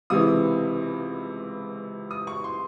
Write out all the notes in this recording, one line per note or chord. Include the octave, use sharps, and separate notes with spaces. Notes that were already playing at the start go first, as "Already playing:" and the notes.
C#2 C3 E3 G#3 D#6
D#6
C#6
C6